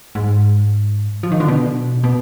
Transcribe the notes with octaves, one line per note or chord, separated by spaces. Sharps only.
G#2
F3
D#3
D3
B2
B2